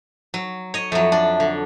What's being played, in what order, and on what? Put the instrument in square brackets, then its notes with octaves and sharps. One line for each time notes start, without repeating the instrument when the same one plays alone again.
[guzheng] F#3
C#5 D#5
[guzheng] F2 F#3 [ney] E5
[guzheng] D4
D3